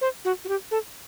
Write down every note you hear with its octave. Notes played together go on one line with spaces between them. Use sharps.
C5
F#4
F#4
G4
A4